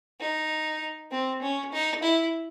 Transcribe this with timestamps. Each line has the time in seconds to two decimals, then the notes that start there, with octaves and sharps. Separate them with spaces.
0.20 D#4
1.11 C4
1.42 C#4
1.72 D#4
2.03 E4